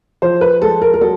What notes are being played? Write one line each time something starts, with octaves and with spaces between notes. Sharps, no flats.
F3 C5
B4
G#3 A4
A#4
A#4
F#3 A4